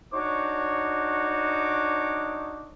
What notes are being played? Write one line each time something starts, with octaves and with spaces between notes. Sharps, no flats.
D4 D#4 F#4 C#5 D6